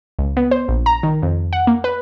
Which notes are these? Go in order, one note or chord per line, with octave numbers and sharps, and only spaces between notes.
C#2
B3
C5
A#1
A#5
D#3
F2
F#5
A#3
B4